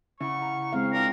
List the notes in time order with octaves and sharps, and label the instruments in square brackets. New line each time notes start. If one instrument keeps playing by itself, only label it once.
[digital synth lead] C#3 [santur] E4 F#5 [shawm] C#6
[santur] A#5
[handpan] G#3 C4 F5
[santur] D4 F4 [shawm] A#4